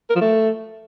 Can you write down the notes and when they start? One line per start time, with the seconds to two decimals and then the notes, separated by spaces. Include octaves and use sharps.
0.10 A#4
0.15 F3
0.21 A3